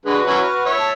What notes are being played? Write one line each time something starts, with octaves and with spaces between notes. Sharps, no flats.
D3 G#3 F#4 B4
F#3 C#4 E4
F6
C#5 E5
A5